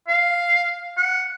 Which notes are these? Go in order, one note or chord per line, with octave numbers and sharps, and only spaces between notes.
F5
F#5